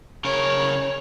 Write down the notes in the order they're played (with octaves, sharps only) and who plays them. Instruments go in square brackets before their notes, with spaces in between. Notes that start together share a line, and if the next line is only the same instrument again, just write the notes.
[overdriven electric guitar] C#3 A#4 [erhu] C#5